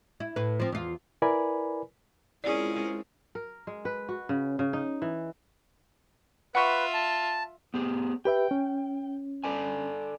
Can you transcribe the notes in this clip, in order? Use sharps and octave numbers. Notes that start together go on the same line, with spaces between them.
E4
A2 B4
F3 C4
E2 F4
E4 A#4 B4 D5 G#5 B5
G#3 C4 C#4 E4 F4 G#4 A#4 D5
A#4
G#3
B4
F#4
C#3
C#3
D#4
E3
F4 B4 E5 F#5 C#6 F#6
A5
B3 G4 G#4
G4 B4 E5 G5
C#4
A4 D5 G#5